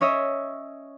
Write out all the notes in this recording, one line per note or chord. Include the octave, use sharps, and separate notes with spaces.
C#4 C#5 D#5 E5